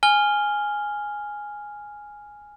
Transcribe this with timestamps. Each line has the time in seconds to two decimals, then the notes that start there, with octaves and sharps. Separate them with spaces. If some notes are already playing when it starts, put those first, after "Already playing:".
0.03 G#5 F6 G7